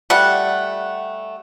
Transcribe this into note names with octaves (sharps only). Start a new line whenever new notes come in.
G3 A3 F#5